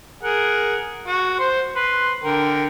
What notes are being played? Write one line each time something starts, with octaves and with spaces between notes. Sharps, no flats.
G#4 A#4 F#5
F#4
C5 C6
B4 C6
D3 A#4 G5